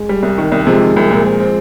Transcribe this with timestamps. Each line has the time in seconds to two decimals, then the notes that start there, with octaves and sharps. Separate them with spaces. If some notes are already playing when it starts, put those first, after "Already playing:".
Already playing: G#3
0.09 G3
0.23 C2
0.38 D#3
0.52 C2
0.66 C3 F3 G#3
0.82 D#3
0.96 C2
1.11 A#2
1.25 C4
1.40 C4